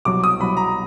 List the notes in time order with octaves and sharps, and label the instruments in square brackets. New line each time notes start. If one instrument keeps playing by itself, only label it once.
[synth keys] C2 B2 F#3 [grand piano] D6
[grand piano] D#6
[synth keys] C2 B2 F#3 [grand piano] B5
[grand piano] A#5